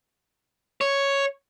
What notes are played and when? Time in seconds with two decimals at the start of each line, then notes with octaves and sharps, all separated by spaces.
0.81 C#5